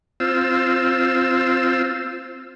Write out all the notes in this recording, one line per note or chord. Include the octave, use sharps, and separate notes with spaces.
C4 F4 E6